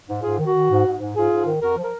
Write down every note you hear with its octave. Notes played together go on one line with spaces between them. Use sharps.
G#2
G#2 F4 G#4
D#3
F#4
D#3
G#2
G#2
G#2
G#2 F4 G#4
G#2
D#3
F2 F#4 A#4
F3
A#4